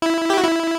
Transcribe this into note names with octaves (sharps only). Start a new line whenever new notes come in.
E4
G4
F#4
E4